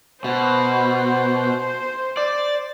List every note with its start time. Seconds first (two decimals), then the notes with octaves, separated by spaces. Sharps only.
0.24 B2 C5
2.17 D5